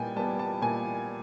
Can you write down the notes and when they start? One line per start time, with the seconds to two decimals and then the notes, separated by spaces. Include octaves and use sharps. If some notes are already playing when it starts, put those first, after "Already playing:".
Already playing: A#2 G3 B3 G5 G#5
0.16 G3 A5
0.19 B3
0.39 A5
0.62 A#2 G#5